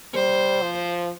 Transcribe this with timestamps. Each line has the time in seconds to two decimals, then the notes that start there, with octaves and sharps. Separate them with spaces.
0.15 G3 C5
0.62 F3